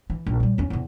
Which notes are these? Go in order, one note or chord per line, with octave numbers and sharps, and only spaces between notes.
E3
A#1
A#2 G3
E2 C#4
E2 C3